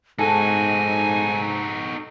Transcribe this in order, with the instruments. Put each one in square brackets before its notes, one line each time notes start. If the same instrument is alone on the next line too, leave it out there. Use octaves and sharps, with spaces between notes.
[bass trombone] G#2 [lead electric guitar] D#4 F#4 [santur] A4 [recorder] G#5